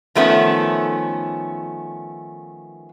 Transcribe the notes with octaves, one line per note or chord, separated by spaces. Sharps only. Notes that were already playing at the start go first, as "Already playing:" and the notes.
D#3 F3 A3 B3 C#4